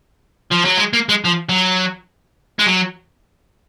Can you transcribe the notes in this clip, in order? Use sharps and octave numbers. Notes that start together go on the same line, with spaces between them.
F3
F#3
G#3
A#3
G#3
F3
F#3
G#3
F#3